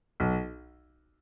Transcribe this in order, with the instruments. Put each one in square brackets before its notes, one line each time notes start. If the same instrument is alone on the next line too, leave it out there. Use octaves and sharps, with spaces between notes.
[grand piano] B1